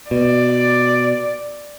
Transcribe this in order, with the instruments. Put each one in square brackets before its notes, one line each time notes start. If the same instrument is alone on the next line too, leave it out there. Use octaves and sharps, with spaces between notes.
[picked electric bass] B2 [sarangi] D5